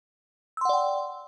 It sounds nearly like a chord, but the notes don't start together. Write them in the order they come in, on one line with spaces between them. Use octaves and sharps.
E6 C6 F#5 D5 G5